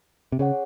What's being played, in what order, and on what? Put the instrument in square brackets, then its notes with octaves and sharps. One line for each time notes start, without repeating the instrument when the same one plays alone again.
[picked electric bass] C3
[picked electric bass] C#3 [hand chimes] C#4 G#4 C#5 F#5